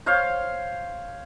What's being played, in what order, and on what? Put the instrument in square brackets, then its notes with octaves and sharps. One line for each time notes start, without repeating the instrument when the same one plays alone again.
[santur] C5 C#5 F5